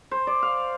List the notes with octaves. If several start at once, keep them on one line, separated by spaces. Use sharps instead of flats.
C5
D5
F5